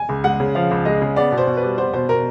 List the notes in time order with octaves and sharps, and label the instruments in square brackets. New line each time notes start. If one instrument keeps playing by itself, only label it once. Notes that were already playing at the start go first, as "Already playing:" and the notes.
Already playing: [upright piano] G#5
[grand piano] C#2
[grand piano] G#3 [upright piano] F#5
[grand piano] C#3
[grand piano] F3 [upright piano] F5
[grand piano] C#2
[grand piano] G#3 [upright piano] D#5
[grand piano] C#3
[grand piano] B3 [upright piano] D5
[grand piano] B2
[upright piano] C5
[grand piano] B2
[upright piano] B4
[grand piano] G3
[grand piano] B3 [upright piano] C5
[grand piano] B2 [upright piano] C5
[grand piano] B2 [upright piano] A#4